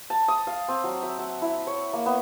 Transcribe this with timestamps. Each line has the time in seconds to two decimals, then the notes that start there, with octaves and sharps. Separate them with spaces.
0.10 A5
0.28 D#6
0.47 F5
0.68 C4
0.84 F#3
1.03 E5
1.19 F#5
1.42 E4
1.67 C#5
1.93 A#3
2.06 B3